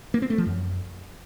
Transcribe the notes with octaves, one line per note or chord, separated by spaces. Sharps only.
A#3
C4
A3
F3
F#2